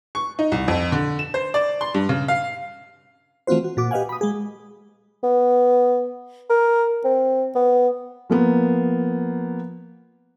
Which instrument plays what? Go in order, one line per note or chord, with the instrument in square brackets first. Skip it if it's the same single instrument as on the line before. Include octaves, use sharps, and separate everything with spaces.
[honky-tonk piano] C#6
D#4
C2
F2
D3
E7
C5
D5
C6
G2
C#3
F5
[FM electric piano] E3 A3 C4 F4 F#4 C5
F#4
A#2 F#4 D6
G4 B4 D#5 F5 F#5 G#5
B5 D#6
G#3 G#4
[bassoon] B3
A#4
C4
B3
[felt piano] F3 A#3 B3